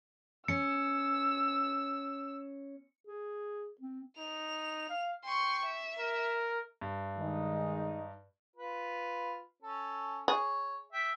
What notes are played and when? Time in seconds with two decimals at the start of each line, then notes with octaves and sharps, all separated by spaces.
0.48 C#4 E6 C#7
3.07 G#4
3.81 C4
4.19 D#4 F7
4.90 F5
5.25 G5 C6 C#6
5.65 E5
5.99 A#4
6.81 G2
7.18 D#3 G#3 D#4
8.56 F4 B4
9.63 C#4 A4
10.28 G#4 C#5
10.93 E5 G5